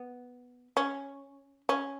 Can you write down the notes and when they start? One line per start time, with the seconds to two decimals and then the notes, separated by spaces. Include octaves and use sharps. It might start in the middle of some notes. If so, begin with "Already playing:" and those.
Already playing: B3
0.77 C#4
1.69 C#4